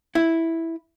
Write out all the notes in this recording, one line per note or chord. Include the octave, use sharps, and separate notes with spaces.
E4